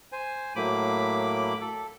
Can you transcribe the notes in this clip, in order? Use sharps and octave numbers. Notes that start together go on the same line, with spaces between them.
C5 G#5
A2 F#3 A#3 B5 D6
A4